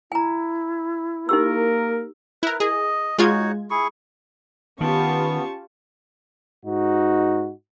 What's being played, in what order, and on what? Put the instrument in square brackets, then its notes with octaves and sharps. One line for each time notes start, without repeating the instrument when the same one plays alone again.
[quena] E4 [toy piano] G#5 A#5
[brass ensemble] A#3 A#4 [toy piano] D#4 G4 E6
[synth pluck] E4 A#4 [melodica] B4
[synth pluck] G#4 [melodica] D#5
[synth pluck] G#3 F4 G#6 [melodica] D#4 F#4 C#5
[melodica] E4 G#4 C#6
[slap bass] D#3 [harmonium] B3 [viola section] C#4 F4 G4 [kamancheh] A5 C#6
[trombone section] G#2 D#4 F#4